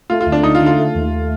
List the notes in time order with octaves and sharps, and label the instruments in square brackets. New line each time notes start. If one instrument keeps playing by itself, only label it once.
[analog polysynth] A3 [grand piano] F4
[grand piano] F4
[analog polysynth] D2
[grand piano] D4
[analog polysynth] D2 [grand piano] D#4
[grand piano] F4
[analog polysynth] D3
[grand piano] F4
[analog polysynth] A3
D#2